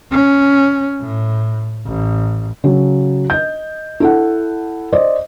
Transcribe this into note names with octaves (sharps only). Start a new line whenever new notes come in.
C#4
A2
A1
C#3 F#3
D#5 G6
E4 A4 F#5
C5 D5 D#5